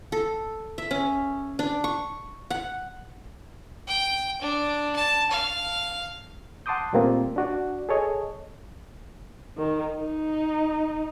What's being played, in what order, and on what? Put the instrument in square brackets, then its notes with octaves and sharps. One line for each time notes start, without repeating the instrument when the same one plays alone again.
[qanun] A4
E5
C#4
D4
C#6
F#5
[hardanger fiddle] G5
D4
A5
F5
[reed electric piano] F#5 A5 C6 D6 D#6 G6
A#2 G3 A3 A#3 C4 F4
D4 F#4 D5
G#4 A4 C#5 D#5
[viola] D#3
D#4